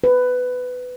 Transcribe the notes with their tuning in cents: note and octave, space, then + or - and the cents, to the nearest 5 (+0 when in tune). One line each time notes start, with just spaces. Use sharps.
B4 +15